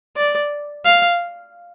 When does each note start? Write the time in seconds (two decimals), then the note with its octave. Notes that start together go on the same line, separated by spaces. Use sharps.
0.17 D5
0.85 F5